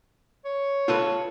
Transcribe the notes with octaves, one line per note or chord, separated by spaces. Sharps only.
C#5
F4 A4 B4